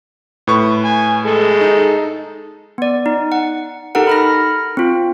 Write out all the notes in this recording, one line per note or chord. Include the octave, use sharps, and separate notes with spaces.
A2 B4 C#6
G#5
G#3 A4
D#4
B3 D5
D#4
F#5
D#4 G4 A4 A#4 F#5
B5 F6 A#6
C4 F4